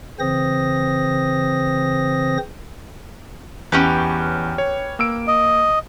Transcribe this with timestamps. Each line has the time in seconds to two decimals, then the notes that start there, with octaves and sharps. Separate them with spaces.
0.19 C#3 E3 C4 C5 D#6 A#6
3.72 E2 C#4 G4 B4
4.58 C#5
4.99 A#3 E6 D7
5.27 D#5